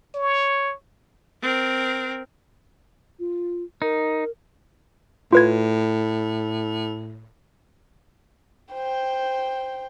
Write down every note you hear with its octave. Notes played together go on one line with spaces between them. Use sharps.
C#5
C4 A#4
F4
D#4 A#4
A2 F4 B4 G#6
C5 G5